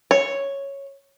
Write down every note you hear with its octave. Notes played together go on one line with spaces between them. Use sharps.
C#5